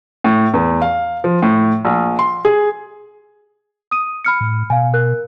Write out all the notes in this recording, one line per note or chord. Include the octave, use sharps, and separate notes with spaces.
A2
E2
F5
F3
A2
A#1
C6
G#4
D#6 D#7
B5 F6 C#7
A2
B2 F5 G#5
A#4 F#6